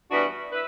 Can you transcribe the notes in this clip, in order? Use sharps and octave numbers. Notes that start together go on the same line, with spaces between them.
E3 G3 B3 D4 F#4
E4 B4